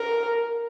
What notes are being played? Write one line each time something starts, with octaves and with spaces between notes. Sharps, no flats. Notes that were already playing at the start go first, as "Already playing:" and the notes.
Already playing: A#4